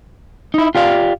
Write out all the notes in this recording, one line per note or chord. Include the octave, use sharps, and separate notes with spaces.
D#4 E4
F4 G4 D5 F5